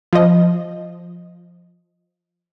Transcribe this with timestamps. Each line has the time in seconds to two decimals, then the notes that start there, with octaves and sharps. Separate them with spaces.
0.13 F3 D#5